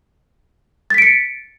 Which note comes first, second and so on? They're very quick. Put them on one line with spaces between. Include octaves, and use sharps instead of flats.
A6 B6 D7 C#7